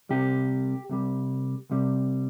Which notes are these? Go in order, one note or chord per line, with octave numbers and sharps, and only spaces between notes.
C2 C3 G3 G4
C2 C3 G3
C2 C3 G3